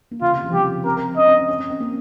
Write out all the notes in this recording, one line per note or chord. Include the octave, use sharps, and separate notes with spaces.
A#3
C#3 F4
C3
C#3
F3
G3 G4
C4 A#4
C#4 D#5
C4
C4
C#4
C#4
C4
A#3